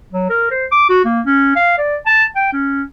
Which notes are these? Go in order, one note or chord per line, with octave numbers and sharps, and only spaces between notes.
F#3
A#4
C5
D6
F#4
A#3
C#4
F5
D5
A5
G5
C#4